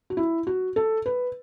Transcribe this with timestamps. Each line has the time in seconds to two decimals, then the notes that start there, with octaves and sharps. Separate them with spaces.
0.10 F#4
0.17 E4
0.47 F#4
0.76 A4
1.06 B4